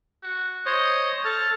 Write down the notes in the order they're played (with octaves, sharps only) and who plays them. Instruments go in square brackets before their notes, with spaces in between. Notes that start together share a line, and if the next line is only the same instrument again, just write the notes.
[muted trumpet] F#4
[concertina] C5 C#5 [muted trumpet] D#5
[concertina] A4 F6 [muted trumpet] A5